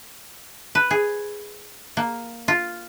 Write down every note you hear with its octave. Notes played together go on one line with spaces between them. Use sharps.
B4
G#4
A#3
F4